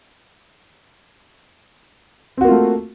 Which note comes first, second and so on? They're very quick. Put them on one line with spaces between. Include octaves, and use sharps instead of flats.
C4 F#4 A#3 F4 A3